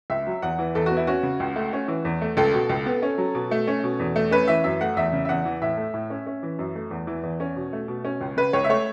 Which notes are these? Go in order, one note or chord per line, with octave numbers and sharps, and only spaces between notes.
C#2 E5
F#3
E2 F#5
E3
E2 A4
F#4
B3
E4
C#4 F#4
C#3
C#2
A3
C#4
E3
E2
A3
C#2 A4
B2
C#2
B3
C#4
F#3
B2
A3
C#4
B2
E2
A3
C#4 B4
E3 E5
F#2 E5
A3 F#5
E2 E5
C#3
E5
E2 F#5
E3
A2 E5
A3
A2
C#4
C#4
E3
F#2
A3
E2
E3
E2
C#4
B2
A3
B2
C#4
C#2
C#3 B4
C#2 C#5
E5
A3 C#5